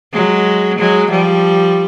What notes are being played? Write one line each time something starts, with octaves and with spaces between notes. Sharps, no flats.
F#3 G#3
F#3 G#3
F3 G3